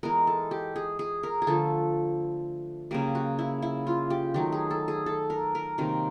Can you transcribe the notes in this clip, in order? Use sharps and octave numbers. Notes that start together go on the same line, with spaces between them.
E3 G#3 B3 A#4
A4
G4
G#4
G#4
A#4
G#4
D3 F3 A3 A4
C#3 F#3 A#3 G4
F#4
E4
E4
F4
G4
D#3 F#3 A3 G4
G#4
A4
G#4
A4
A#4
A#4
C3 D#3 F#3 A#3